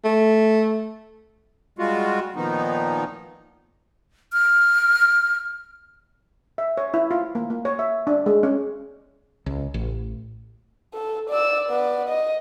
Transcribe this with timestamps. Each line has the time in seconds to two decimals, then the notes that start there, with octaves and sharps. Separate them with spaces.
0.04 A3
1.79 G3 G#3 F4 F#4
2.36 A#2 D#3 F3 B3 D#4
4.33 F6
6.58 E5
6.77 C#5
6.94 E4
7.11 F4
7.35 A#3
7.50 A#3
7.65 C#5
7.79 E5
8.07 D4
8.26 G#3
8.43 C#4
9.46 C#2
9.74 A1
10.94 A4
11.29 D5 E6
11.69 B3 D5
12.09 D#5